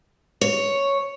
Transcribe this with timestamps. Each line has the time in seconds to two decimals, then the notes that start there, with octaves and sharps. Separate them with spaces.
0.41 C#5